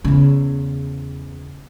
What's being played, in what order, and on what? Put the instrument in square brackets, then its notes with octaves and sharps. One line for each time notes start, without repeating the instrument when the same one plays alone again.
[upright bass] E2 C#3